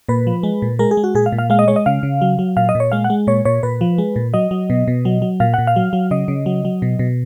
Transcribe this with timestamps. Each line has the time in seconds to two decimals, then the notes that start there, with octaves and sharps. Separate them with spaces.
0.09 A#2 B4
0.27 F3
0.43 G#3
0.62 A#2
0.79 G#3 A#4
0.91 G#4
0.97 G#3
1.04 F#4
1.15 A#2 G#4
1.26 F5
1.32 A#2
1.38 F5
1.50 G#3 F5
1.59 D#5
1.68 G#3 C#5
1.76 D#5
1.86 C#3 F5
2.03 C#3
2.21 F#3
2.39 F#3
2.57 A#2 F5
2.69 D#5
2.75 A#2
2.80 C#5
2.92 G#3 F5
3.04 F#5
3.10 G#3
3.27 A#2 C#5
3.45 A#2 C#5
3.63 A#2 B4
3.81 F3
3.98 G#3
4.16 A#2
4.34 F#3 D#5
4.51 F#3
4.70 B2
4.88 B2
5.05 F#3
5.22 F#3
5.40 A#2 F5
5.54 A#2 F#5
5.67 F5
5.76 F#3
5.93 F#3
6.11 C#3 D#5
6.28 C#3
6.46 F#3
6.65 F#3
6.82 B2
6.99 B2